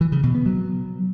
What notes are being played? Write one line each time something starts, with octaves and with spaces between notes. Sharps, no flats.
E3
C#3
B2
B3
F#3